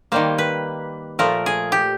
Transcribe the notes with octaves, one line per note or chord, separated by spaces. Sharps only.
D#3 G3 A#3 C5
B4
A#2 F3 A3 A#4
G#4
G4